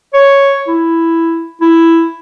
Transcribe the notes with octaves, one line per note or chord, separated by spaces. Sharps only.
C#5
E4
E4